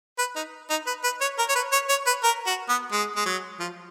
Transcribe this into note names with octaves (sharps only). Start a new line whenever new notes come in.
B4
D#4
D#4
B4
B4
C#5
A#4
C#5
B4
C#5
C#5
B4
A#4
F#4
B3
G#3
G#3
F#3
F3